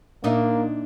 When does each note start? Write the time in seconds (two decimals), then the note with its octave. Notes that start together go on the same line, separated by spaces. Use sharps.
0.24 A#2 A#3 D4 D#4 E5